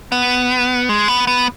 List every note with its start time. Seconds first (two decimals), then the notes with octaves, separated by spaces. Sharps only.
0.12 B3
0.89 G#3
1.08 B3
1.27 B3